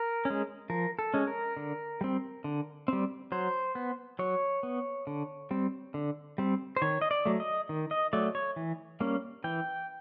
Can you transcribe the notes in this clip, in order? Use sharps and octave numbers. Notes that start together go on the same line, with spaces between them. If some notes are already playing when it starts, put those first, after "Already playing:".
Already playing: A#4
G#3 C#4
F3 A#4
A4
G#3 C#4
A#4
D3
G3 C4
D3
G3 C4
F#3 C5
B3
F#3 C#5
B3
D3
G3 C4
D3
G3 C4
C5
D#3 C#5
D#5
D5
F#3 A3
D#5
D#3
D#5
F#3 A3 D5
C#5
E3
G3 A#3 C#4
E3 G5